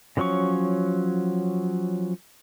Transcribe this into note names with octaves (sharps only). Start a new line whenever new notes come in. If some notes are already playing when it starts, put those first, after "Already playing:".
C#3 F3 F#3 C#4 C#6